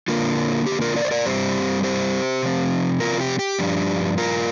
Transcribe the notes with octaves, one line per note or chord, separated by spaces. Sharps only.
D3 A#3 D4 F4 A#4
G4
F4 A#4
A#4 D5
C5
A#4 D5
G2 G3 C4 G4 C5
G4 C5
C3 F3 C4
F4 A#4
G4
G4
G2 F3 D4
F4 A#4